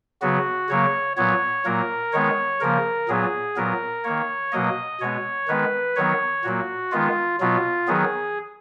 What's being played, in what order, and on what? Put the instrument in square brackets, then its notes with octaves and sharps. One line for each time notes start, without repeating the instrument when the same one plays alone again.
[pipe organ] C#3 F#3 B3 F#4
C#3 F#3 A#3 C#5
A#2 F#3 B3 C#5
A#2 F#3 A#3 A#4
D#3 G#3 B3 C#5
C#3 F3 A#3 A#4
A#2 F#3 B3 G#4
A#2 F#3 B3 A#4
D#3 A#3 C#5
B2 F#3 A#3 D#5
B2 G#3 B3 C#5
D#3 G#3 B3 B4
D#3 F#3 B3 C#5
A#2 F#3 A#3 F#4
D#3 G#3 B3 F4
B2 F#3 B3 F4
D#3 F#3 B3 G#4